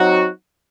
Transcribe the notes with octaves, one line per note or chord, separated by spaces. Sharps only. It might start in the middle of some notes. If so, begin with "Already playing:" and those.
Already playing: F#3 C4 D#4 F#4